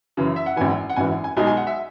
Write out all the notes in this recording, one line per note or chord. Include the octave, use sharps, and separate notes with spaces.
F#2 C#3 E3
E5
F#5
G#1 F#2 E3 G#5
F#5
G#1 F#2 E3 G#5
G#5
B1 B2 G#3 D#4 G#5
G#5
F#5
E5